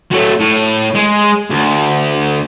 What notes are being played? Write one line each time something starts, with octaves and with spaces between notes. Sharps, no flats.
F#3 A3
A2
G#3
D2